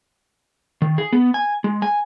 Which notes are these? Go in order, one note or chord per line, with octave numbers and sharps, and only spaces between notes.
D#3
G#4
B3
G#5
G#3
G#5